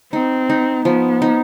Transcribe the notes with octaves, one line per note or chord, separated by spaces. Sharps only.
C4 D#4
D#4
F3 B3
D#4